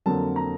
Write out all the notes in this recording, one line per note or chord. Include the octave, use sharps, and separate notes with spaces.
F2 D3 F#3 A#3 A5
A#5